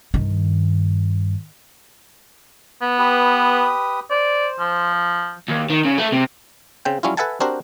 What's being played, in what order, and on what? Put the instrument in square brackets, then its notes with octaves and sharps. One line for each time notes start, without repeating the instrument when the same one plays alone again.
[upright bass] G2 D#3
[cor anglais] B3
[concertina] G4 B4 D#6
[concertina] C5 [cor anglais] D5
[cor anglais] F3
[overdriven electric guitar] D#2
D#3
C#3
A3
C3
[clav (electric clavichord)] C#3 C4 G5
F#3 G3 C#4 E4 F4
A4 B4 E5 F#5 G#5 A5
C4 D4 F#4 G4 A#4 C5